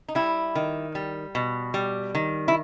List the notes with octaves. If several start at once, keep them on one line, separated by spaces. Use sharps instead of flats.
D#4
G3 E4
D#3
G3
B2
G3
D#3
E4